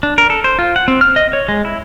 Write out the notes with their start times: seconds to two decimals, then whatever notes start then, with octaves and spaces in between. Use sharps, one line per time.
0.03 D4
0.18 A#4
0.30 A4
0.44 C5
0.59 F4
0.76 F#5
0.88 C4
1.01 F6
1.16 D#5
1.33 C#5
1.48 G#3
1.65 E4